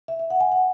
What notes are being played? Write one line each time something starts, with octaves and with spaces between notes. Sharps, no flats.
E5
E5
F#5
G#5
F#5